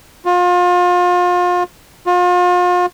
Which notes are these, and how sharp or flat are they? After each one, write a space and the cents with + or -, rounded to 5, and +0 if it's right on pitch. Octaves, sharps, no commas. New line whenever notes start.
F4 +35
F4 +40